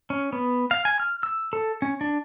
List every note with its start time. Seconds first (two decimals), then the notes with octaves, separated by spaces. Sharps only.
0.10 C#4
0.33 B3
0.71 F5
0.85 G#5
1.00 F6
1.23 E6
1.53 A4
1.82 C#4
2.01 D4